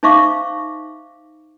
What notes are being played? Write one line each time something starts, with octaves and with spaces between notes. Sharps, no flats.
D#4 C5 E5 F5 C#6 D6